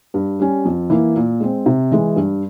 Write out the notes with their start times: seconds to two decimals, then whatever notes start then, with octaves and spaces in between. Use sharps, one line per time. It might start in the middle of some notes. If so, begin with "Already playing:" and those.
0.14 G2
0.39 G3 C#4
0.65 F2
0.90 E3 A#3 E4
1.16 A#2
1.40 G#3 C4
1.66 C3
1.92 E3 G#3
2.16 G2